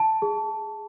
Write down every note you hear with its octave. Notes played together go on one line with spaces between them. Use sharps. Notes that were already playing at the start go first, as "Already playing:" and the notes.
Already playing: A5
G#4